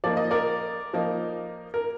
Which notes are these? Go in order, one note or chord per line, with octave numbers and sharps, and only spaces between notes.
F3 A#3 D#4 D5
D#5
A#4 D5
F3 A#3 D#4
A#4